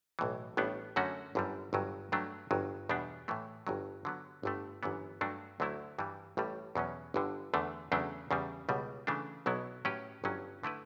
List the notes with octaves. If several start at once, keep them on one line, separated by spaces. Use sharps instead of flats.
B1 A2 E3
A1 A2 G3 B3 D4
F#2 D3 A3 C#4 F#4
G1 F#2 D3 G3
G1 G2 F#3
G2 F#3 A3 D4
G1 G2 F#3
E2 B2 G3 B3 D4
A2 E3 A3
G1 G2 F#3
D3 F#3 B3
G1 G2 D3 A3
G1 F#2 E3 B3
G2 F#3 A3 D4 F#4
D2 D3 F#3 A3 E4
G2 E3 G3
A1 A2 G3
E2 B2 F#3 C#4
G1 G2 D3
E2 D3 A3
E2 C#3 F#3 A3 D4
E2 C#3 G3
C#2 B2 G3
C#3 E3 A3 D4
B1 B2 F#3 B3 E4
A2 F#3 C#4 G4 B4
G1 G2 F#3 C#4
D3 A3 E4 B4